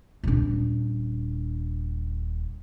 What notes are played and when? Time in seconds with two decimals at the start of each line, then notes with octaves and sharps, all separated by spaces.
0.23 D#1 D4